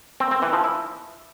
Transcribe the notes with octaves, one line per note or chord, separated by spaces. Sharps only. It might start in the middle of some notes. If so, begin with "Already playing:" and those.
C4
C4
E3
F3
E4